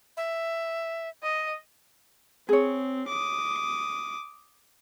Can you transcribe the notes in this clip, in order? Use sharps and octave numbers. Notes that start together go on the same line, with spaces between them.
E5
D#5
C4 G#4 C#5
D6 D#6